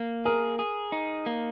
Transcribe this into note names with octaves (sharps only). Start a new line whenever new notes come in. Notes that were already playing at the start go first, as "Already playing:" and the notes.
Already playing: A#3
G#4 A#4
G#4
D#4
A#3